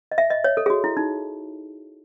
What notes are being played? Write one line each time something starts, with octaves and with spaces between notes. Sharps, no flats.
D#5
E5
D#5
C#5
A4
G#4
F#4
E4
D#4